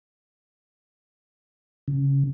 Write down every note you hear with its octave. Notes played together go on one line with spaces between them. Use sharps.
C#3